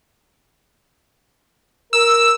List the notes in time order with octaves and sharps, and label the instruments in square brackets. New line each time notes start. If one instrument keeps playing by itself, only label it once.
[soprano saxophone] A#4 [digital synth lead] E6